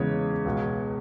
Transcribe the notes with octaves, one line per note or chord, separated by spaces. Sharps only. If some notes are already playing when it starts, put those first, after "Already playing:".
Already playing: E2 C#3 G#3 C#5
C#2 B2 G#3